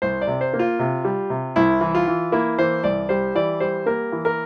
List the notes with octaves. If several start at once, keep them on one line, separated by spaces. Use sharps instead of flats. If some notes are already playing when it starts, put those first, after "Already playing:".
C2 C5
D5
C3
C5
A#3
F4
C3
G3
C3
C2 E4
E3
F4
E3
A#3 E4
E3 C5
C2 D5
G3 C5
E3 D5
G3 C5
A#3 A#4
E3
A#4